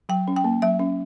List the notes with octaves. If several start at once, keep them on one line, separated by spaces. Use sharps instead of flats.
F#3 G5
C#4
G5
A#3
F#3 E5
C#4